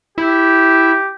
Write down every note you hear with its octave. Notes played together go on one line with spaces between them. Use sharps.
E4 G4